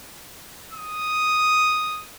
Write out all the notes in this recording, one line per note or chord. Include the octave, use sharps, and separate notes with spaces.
D#6